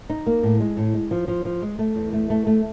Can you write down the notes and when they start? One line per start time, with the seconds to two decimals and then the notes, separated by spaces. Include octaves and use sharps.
0.10 D#4
0.26 A#3
0.43 A2
0.60 G#3
0.77 A2
0.94 G#3
1.11 F3
1.28 F3
1.45 F3
1.62 G#3
1.79 A3
1.96 E2
2.13 A3
2.30 A3
2.47 A3